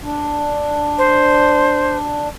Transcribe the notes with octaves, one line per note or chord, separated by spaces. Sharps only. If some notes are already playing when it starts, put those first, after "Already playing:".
D4
C5